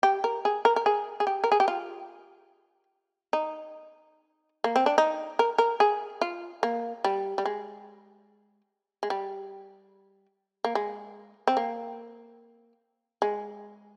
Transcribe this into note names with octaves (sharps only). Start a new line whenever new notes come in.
G4
A#4
G#4
A#4
A#4
G#4
G#4
G4
A#4
G#4
G4
F4
D#4
A#3
C4
D4
D#4
A#4
A#4
G#4
F4
A#3
G3
G3
G#3
G#3
G3
A#3
G#3
C4
A#3
G#3